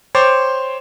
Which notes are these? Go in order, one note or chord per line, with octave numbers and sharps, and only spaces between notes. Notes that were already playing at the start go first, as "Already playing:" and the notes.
C5 C#5 G5 C6 D6 A6